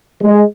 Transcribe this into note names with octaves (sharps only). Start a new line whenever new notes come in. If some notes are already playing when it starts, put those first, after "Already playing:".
G#3